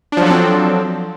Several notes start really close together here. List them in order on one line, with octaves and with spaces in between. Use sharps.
D4 F3 F#3 A4 C4